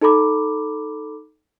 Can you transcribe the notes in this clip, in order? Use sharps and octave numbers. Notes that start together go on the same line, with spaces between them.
D#4 A4 A#5 B5 D6